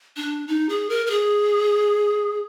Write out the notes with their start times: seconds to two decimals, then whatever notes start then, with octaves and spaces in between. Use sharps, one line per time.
0.17 D4
0.48 D#4
0.69 G#4
0.89 A#4
1.06 A#4
1.10 G#4